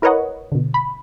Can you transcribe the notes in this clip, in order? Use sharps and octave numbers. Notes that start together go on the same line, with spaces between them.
E4 A#4 B4 C#5 D#5 F#5
B2 D3
B5